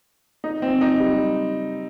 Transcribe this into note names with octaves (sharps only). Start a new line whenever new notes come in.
D#4
C4
D#4
G3